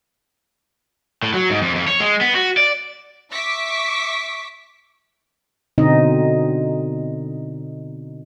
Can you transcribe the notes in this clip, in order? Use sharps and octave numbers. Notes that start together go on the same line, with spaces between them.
A2
F#3
G#2
F2
F2
C#5
G#3
B3
F#4
D5
E5 C#6 D6 B6
B2 D3 C4 D#4 D#5